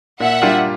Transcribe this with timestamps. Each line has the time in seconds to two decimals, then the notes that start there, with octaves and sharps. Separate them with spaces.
0.20 A#2 E5 F#5
0.42 G3 A#3 D4 F4